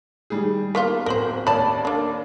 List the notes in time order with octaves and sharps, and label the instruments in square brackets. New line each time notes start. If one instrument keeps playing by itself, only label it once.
[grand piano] D#3 G3 G#4
[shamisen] A#3 B3 F4 [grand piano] B6
[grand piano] D1 F#7 [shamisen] A#4 C5
[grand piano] D#2 C#4 D5 [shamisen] A5 B5
[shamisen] A#3 D4